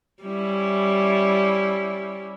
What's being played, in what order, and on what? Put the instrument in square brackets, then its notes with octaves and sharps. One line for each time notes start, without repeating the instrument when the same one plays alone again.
[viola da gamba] G3 C#4 E4